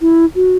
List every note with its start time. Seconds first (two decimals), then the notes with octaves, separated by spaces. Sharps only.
0.01 E4
0.35 F#4